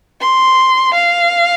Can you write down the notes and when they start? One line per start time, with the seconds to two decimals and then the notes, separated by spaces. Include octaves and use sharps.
0.20 C6
0.94 F5